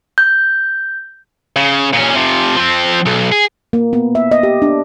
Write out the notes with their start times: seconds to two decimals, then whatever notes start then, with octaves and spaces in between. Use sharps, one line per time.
0.18 G6
1.56 C#3
1.93 A#2 C#4
2.15 C3 F3
2.56 F3 C4
3.06 B1
3.32 G#4
3.73 A#3
3.93 B3
4.15 E5
4.31 D#5
4.43 G4
4.62 D4